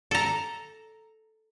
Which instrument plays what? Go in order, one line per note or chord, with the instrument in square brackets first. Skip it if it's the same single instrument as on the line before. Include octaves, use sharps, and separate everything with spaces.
[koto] A4 A#5